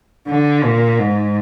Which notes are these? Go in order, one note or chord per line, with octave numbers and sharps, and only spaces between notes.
D3
A#2
G#2